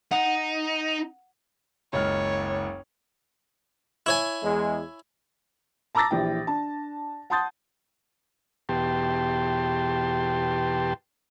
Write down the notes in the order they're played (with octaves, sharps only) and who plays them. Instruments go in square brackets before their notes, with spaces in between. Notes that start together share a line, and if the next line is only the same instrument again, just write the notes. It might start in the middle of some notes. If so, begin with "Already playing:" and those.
[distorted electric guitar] D#4 [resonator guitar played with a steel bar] F#5
[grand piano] F#1 C#2 F6 [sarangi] C#5
[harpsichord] E4 C#5 G#5
[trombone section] E2 G#3
[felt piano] A5 A#5 D6 E6 A6 A#6
A#1 E3 G4 G5
D4 A5
F#5 A5 C6 D#6 G6 A6
[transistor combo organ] E2 B2 G4 G5 A5 C6